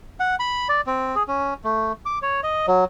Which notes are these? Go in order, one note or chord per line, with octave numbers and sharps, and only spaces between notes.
F#5
B5
D5
C4
G#4
C#4
A3
D6
C#5
D#5
F#3